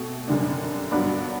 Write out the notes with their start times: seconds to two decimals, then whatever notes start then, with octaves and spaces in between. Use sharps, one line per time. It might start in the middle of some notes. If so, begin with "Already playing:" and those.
Already playing: B2 A3 C4
0.28 F#2 D3 G3 D4
0.91 G2 F#3 B3 D4 F#4